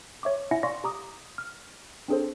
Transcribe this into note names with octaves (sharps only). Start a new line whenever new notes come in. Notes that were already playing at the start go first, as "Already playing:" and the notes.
C#5 E5 C#6 D6
E4 E5 F#5 G#5 A#6 C#7
D5 F5 C6 C#6 A#6
G4 A#5 D6 D#6
F6
C4 D4 G#4 A4 C5